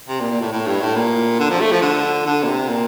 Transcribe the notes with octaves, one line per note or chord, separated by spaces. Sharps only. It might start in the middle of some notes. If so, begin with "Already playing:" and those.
C3
A#2
A#2
A2
A2
G2
A2
A#2
D3
F3
A3
F3
D3
D3
A#2
C3
A#2